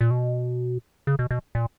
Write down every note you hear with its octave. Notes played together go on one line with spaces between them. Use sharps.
A#2
B2
C#3
B2
B2
A#2